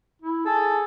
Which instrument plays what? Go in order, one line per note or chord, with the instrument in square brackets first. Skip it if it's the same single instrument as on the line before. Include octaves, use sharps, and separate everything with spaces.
[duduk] E4
[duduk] G#4 [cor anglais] A4